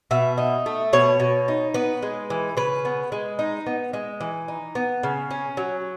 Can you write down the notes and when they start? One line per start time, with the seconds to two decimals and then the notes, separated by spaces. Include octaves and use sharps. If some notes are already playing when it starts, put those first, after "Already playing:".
0.11 B2 E5
0.38 D#4
0.66 A3
0.93 B2 C#5
1.20 B2
1.48 D#4
1.74 B3 B4
2.02 G#3
2.30 E3
2.57 C#3 B4
2.85 B3
3.12 G#3
3.39 D#4
3.67 B3
3.93 G#3
4.21 E3
4.48 D#4
4.75 B3
5.03 C#3
5.31 C#4
5.57 F#3